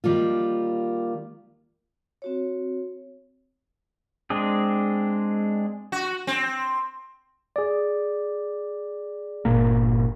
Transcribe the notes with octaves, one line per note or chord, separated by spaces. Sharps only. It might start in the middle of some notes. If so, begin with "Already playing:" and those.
D#3 G3 A#3 F4
C4 F#4 C#5
G#3 C4 D4 G#4
F#4
C4
G#4 D5
G1 A#2 A#3